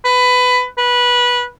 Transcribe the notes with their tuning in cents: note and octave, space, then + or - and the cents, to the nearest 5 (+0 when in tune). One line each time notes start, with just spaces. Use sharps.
B4 +15
B4 -15